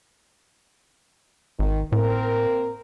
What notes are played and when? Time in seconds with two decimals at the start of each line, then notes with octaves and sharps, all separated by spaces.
1.59 G#1 D#3
1.92 A2 A#3 C4 A#4